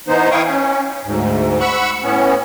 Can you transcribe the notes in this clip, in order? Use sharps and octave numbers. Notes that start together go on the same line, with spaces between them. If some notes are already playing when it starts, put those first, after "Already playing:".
E3 B3 D#4 C5
E4 F5 G5 C#6 D#6
C#4
D2 G#2
F#5 B5 C#6 E6 F#6
A2 B3 C#4